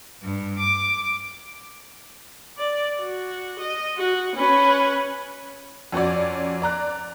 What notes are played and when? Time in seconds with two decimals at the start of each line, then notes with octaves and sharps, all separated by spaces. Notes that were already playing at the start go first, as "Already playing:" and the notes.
0.23 G2
0.60 D6
2.58 D5
3.00 F#4
3.60 D#5
3.97 F#4
4.36 C#4 B4
5.92 F2 C#4 F#4 C#5 D5
6.62 D5 A#5 F#6